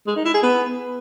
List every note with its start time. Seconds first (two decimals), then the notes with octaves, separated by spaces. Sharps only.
0.07 G#3
0.16 D#4
0.25 E4
0.34 G#4
0.43 B3